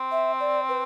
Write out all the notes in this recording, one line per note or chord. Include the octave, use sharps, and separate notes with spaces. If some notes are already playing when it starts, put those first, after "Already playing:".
Already playing: C4
E5
D5
B4